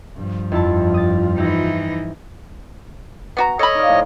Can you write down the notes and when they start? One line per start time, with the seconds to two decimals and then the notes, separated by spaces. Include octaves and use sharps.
0.16 G2 F3
0.52 F2 E4 F4 A5
0.94 D#6 A6
1.38 E3 D#4 E4 G4
3.37 B3 F#4 A#5
3.59 A4 C#5 D#5 B5
3.75 D#4 D5 F5
3.87 A2 F3